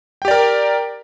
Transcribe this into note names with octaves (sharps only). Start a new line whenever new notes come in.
G4 A#4 D5 G5